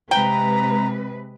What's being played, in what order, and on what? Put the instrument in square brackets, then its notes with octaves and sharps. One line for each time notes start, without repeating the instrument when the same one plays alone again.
[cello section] C3 G#3 B4 [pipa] G5 [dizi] A#5